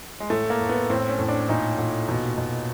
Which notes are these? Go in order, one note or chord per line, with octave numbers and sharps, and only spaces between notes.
G#3
A2 A3
A#3
A2
B3
A2 C4
C#4
A2
D4
A#2 D#4
A#2
B2
B2